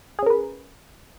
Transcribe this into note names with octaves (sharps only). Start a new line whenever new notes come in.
C#4 G#4 A#4 B4